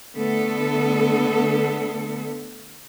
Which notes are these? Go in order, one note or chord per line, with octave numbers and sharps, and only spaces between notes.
D3 A3 B3 A4